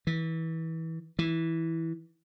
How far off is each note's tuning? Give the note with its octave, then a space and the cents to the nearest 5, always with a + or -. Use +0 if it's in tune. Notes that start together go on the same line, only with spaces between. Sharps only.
E3 -25
E3 -10